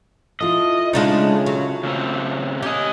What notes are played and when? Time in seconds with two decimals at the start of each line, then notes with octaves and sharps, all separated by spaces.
0.41 E4 F4 A4 D#5
0.93 C#3 G#3 D4 D#4
1.46 F#3
1.83 C#3 A3 C4
2.63 C#4 G4 D#5